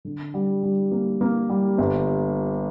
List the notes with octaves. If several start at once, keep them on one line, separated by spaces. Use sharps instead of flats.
D3
G3
G3
A#3
A#3
G3
G1